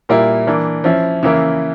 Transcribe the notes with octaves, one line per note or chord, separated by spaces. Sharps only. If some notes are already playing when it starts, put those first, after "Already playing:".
A#2 G3 A#3 E4
E3 A#3 D4
F3 C#4 E4
C#3 E3 A#3 E4